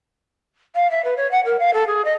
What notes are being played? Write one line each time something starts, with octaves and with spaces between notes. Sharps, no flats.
F5
E5
B4
C#5
F#5
A#4
F5
A4
G#4
D#5